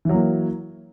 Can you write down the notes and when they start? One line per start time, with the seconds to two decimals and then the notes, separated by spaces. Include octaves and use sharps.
0.05 E3
0.09 F#3
0.14 A#3